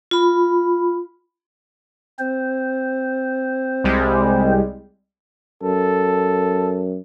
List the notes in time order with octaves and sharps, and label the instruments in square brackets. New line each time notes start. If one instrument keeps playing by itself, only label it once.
[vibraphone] F4 B5
[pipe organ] C4 C5
[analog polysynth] C2 G3 G#3
[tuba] F#2 [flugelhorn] A4